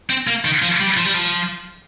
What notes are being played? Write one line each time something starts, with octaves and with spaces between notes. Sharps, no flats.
C4
A#3
D#3
F3
G3
F3
G3
F3